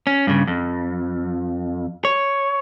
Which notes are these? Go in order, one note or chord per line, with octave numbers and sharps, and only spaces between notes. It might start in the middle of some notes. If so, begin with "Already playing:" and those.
C#4
G2 C#3
F2
C#5